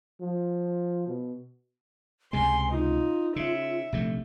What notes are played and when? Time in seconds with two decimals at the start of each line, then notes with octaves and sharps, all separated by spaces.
0.21 F3
1.07 B2
2.33 C#2 C3 G#3 G#5 C6
2.71 D#4 F4
3.36 C#3 E5
3.92 A#1 C3 A3